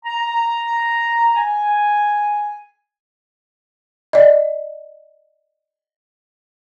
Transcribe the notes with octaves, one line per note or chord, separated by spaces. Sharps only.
A#5
G#5
D5 D#5